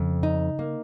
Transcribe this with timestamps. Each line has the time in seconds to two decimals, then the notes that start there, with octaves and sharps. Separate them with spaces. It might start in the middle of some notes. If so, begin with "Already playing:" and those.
Already playing: F2 C#3
0.23 D#4
0.59 A#3